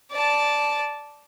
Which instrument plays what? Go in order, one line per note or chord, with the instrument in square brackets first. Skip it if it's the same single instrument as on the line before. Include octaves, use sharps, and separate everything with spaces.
[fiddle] D5 A5